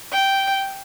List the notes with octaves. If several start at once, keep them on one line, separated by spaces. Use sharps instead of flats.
G5